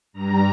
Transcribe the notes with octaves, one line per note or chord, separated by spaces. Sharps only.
G2 G3 A#5